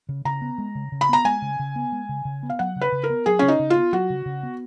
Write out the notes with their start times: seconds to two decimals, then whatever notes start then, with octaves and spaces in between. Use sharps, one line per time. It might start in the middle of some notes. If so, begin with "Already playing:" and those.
0.09 C#3
0.25 C#3 A#5
0.41 B3
0.58 G#3
0.75 C#3
0.92 C#3
1.01 B5
1.09 B3 A#5
1.25 G#3 G#5
1.42 C#3
1.59 C#3
1.76 B3
1.92 G#3
2.09 C#3
2.25 C#3
2.43 B3
2.50 F5
2.59 F#3 F#5
2.76 C#3
2.81 B4
2.92 C#3
3.04 A#4
3.10 B3
3.26 F#3 G#4
3.39 C#3 C#4
3.48 D#4
3.59 C#3
3.70 F4
3.76 B3
3.93 F#3 F#4
4.10 C#3
4.26 C#3
4.43 B3